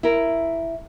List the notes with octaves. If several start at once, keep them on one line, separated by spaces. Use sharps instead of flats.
E4 A#4